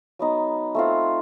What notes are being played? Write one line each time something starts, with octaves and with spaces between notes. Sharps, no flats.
F#3 B3 D#4
A3 C4 F4